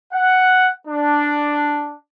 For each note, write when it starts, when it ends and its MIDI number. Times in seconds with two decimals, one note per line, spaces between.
0.13 0.70 78
0.87 1.94 62